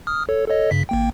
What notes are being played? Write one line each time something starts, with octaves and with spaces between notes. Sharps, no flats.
D#6 F6
A4 C#5
A4 C#5 D#5
G2 C#3 B6
G#1 A#3 G5